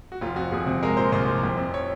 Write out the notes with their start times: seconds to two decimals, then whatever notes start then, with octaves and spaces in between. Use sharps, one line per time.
0.12 F#4
0.21 F1 F4
0.36 F2 F#4
0.51 F1 G#4
0.67 C3
0.83 G#3 A#4
0.97 A#2 C5
1.12 C2 C5
1.28 F3
1.44 F1
1.58 F2
1.74 C#5